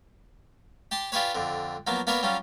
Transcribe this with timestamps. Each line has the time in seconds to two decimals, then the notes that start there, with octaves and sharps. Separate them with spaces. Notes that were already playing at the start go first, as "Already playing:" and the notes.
0.91 G4 A5 C6
1.12 D4 F4 G4 G#4 B4 C#5
1.35 F2 D3
1.87 F3 F#3 A#3 B3
2.07 A#3 B3 D4 A#4 B4 C#5
2.23 F#3 G3 C#4 F4